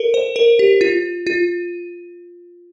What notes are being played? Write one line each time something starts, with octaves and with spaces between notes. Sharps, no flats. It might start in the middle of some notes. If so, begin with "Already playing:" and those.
Already playing: A4 A#4
C5
A#4
G4
F4
F4